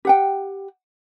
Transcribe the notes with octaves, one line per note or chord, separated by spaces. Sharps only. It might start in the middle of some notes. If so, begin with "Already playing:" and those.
G4 F#5 G5